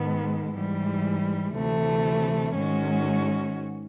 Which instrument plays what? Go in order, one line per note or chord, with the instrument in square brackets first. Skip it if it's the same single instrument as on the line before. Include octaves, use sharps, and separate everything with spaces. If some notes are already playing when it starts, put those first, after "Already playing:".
Already playing: [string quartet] G#2 D#3 G#3 B3
G#2 E3 G3
D2 C3 E3 A3
G#2 D#3 G#3 C#4 F#4